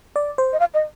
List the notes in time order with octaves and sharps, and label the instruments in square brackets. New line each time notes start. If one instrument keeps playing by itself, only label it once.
[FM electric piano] D5
C5
[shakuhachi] D#5
F5
D#5